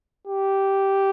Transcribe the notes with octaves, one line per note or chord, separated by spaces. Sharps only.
G4